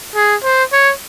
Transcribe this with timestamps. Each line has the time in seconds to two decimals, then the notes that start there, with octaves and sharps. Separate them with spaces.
0.15 G#4
0.44 C5
0.72 C#5